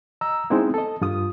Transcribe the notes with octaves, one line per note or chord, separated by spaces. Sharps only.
D#5 A#5 E6
G#3 B3 C4 D#4 E4
A4 D#5
G2 F4 D#6